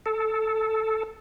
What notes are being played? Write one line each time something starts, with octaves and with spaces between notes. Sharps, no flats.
A4